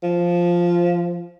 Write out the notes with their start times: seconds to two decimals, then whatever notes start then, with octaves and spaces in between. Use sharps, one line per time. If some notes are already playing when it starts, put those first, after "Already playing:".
0.03 F3